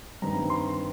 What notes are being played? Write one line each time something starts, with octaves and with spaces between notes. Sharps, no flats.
G2 D#3 G3 C4 A#5
C6